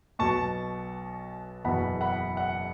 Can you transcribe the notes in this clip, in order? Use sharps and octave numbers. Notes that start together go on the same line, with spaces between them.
B1 B2 B3 A5 C#6
F#1 E2 B2 B3 F#5 B5
F#5 B5
F#5